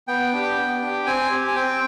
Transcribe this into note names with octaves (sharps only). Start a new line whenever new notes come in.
B3 G5
D4 G4
B3
D4 G4
C4 G#5
G4
G#5
C4 G5